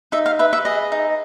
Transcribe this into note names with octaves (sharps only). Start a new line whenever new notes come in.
D#4 E5
F5
B4 E5
E5
G#4 D#5
D#4